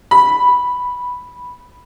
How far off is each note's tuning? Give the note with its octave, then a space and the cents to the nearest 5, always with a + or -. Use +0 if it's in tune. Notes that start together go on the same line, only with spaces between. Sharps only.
B5 -5